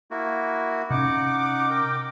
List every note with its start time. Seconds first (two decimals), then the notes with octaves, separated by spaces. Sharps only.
0.11 A#3 E4 F#4
0.90 C3 C#4 D#4 F#5 D6
1.70 A#4 G5